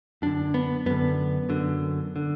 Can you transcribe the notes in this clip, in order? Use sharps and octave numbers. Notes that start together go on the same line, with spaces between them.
F#2 D3 D4
B3
F#2 D3 B3
F#2 D3
D3